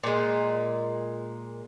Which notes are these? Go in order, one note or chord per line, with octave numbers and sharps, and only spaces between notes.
A#2 G#3